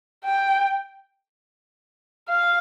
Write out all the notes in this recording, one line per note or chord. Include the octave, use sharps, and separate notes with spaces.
G5
F5